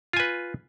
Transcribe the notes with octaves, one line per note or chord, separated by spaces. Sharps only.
F4 B4 G#5